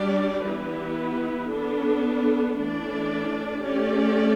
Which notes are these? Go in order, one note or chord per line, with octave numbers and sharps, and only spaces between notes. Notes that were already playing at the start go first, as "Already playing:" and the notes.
Already playing: G3 D4 G4 D5
E3 B3 E4 G4 B4
B3 D4 A4
E3 A3 D4 A4 D5
A3 C#4 G4 D5